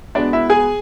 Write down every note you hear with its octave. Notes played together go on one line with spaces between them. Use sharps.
B2 G#3 B3 D4 D5
E4 E5
G#4 G#5